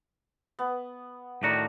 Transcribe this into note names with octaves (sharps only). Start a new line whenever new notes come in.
B3
A2 D#3 D4 F#4 D5 A#5